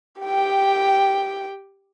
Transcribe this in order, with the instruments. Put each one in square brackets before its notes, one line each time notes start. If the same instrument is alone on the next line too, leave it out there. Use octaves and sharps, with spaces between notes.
[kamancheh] G4 G5